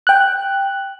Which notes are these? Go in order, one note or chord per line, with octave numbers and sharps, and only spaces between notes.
G5 F#6